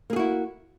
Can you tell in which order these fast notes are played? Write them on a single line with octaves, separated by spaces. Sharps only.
A#3 G#4 F#4 E4